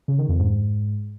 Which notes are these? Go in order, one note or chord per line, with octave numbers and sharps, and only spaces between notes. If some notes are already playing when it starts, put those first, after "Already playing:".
C#3
D#3
F2
G#2